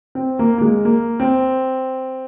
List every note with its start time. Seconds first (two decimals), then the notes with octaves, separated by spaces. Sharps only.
0.15 C4
0.39 A#3
0.58 A#3
0.61 G#3
0.85 A#3
1.20 C4